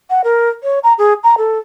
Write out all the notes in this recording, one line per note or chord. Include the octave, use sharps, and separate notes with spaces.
F#5
A#4
C#5
A#5
G#4
A#5
A4